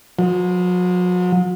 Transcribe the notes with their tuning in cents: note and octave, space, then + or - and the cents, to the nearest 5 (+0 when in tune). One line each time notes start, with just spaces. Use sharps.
F#3 -45